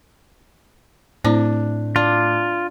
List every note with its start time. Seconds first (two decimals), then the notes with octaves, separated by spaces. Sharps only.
1.24 A2 A3 C4 D4 E4 C5
1.96 D4 F4